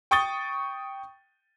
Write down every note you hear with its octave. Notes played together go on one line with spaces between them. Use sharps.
G5 C#6 D#6 A6 G7